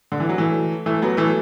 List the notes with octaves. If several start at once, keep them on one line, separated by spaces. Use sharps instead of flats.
D3
E3
F#3
E3 A3
E3 A3
F#3 B3
E3 A3